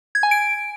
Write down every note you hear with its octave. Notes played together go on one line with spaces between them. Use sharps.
G#6
G#5
D7